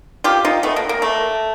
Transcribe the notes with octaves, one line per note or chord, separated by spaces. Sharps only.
F4 G4
D#4 F4
A3 B3
A#3
A#3
A3